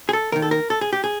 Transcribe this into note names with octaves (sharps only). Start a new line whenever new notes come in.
G#4
A4
D#2 D#3 A#4
A4
A#4
A4
G#4
G4
G#4